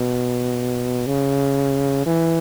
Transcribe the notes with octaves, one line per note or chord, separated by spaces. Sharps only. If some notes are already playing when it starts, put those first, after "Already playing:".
Already playing: B2
C#3
E3